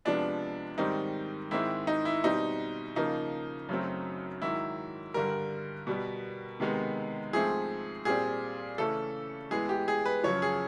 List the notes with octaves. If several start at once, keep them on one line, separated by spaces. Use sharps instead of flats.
C3 F3 G#3 B3 D4
G#2 D#3 G3 C4 D#4
G#2 D#3 G#3 C4 E4
D#4
E4
B2 G3 C4 D#4
C#3 F3 A#3 D#4
F#2 C#3 F#3 A3 C4
G#2 D#3 F#3 E4
G2 D3 G3 A#4
B2 G3 B3
C3 D#3 G#3 B3
G#2 F3 A3 C4 G#4
A#2 G3 C4 G#4
C#3 E3 A3 C#4 A4
A2 E3 G#3 B3 G#4
G4
G#4
B4
F#2 C#3 F3 C#5
G#4